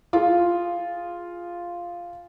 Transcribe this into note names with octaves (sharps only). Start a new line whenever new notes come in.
F4 G#4